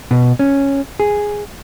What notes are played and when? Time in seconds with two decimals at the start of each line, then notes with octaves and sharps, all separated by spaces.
0.11 B2
0.39 C#4
1.00 G#4